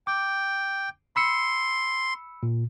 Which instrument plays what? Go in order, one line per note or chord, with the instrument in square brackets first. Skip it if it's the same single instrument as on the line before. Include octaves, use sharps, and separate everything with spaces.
[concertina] G5 [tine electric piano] D6
[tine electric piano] B5 E6 C#7 [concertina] C6
[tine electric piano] A#2